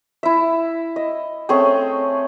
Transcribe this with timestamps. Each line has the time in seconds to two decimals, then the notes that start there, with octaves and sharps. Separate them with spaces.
0.23 E4 E5
0.96 D#5
1.49 A3 C4 C#4 G#4